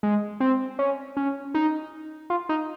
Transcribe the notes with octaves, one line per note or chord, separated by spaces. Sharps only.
G#3
C4
C#4
C#4
D#4
F4
D#4